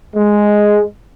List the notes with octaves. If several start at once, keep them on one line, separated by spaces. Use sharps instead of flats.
G#3